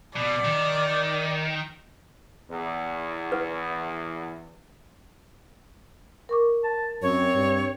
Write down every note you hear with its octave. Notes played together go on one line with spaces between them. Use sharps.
B2 D5
D#3
E2
B4
A#4 C#6 D6
A5
F#2 C4 C#5
G2